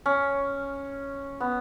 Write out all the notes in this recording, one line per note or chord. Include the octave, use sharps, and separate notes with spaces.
C#4
B3